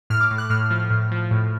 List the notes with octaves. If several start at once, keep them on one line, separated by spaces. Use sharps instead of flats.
A2 F6
D6
A2
F#6
A2 F6
F3
A2
F3
A2